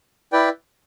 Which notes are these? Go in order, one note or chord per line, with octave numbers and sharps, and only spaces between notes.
E4 B4 D5 G5